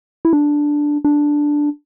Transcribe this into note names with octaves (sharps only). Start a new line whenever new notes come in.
E4
D4
D4